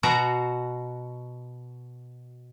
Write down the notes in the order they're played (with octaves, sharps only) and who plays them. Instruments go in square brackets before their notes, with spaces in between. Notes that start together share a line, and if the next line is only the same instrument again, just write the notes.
[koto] B2 F#4 A#5